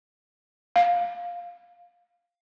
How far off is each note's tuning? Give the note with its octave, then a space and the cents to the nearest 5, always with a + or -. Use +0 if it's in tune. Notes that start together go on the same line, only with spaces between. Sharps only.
F5 +5